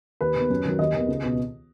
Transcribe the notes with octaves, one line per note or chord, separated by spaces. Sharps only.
D#2 B4
D#3 B3
F#2
D#3 F#3
D#2 D#5
D#3 B3
C#2
B2 B3